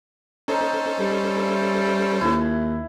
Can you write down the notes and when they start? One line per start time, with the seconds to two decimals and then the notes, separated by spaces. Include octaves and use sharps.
0.48 C#4 D#4 A4 C5
0.99 G3
1.39 E5
2.21 D#2 E4